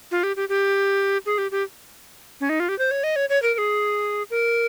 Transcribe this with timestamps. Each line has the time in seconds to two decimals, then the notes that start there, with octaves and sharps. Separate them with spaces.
0.11 F4
0.23 G4
0.36 G4
0.49 G4
1.26 G#4
1.38 G4
1.51 G4
2.41 C#4
2.49 D#4
2.60 F4
2.69 G4
2.79 C5
2.91 C#5
3.04 D#5
3.16 C#5
3.29 C#5
3.42 A#4
3.54 A#4
3.58 G#4
4.30 A#4